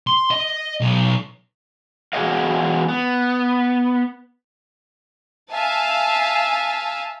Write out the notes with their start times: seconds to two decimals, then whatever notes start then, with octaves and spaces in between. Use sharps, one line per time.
0.07 C6
0.31 D#5
0.80 B1
2.13 E2 F#4 G#4 C#5 D#5 F5
2.88 B3
5.51 E5 F5 G#5 A5